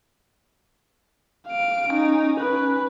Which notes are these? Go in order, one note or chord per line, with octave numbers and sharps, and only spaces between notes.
F5 D7
C#4 D#4
C#4 B4